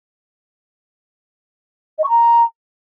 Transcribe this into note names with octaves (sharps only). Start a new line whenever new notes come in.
D#5
C#6
A#5